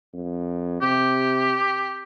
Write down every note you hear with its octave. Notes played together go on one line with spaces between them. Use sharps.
F2
C3 G4